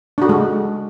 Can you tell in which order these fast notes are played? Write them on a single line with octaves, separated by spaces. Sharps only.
D4 F#4 A4 G#3